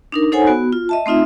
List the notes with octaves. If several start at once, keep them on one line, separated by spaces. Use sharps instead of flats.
D4 D#4 A#4
D#4 A4 C5 C#5 F#5 G#5
B3 F#4
F4
D#5 E5 A5
A3 C4 D#4 F4 E5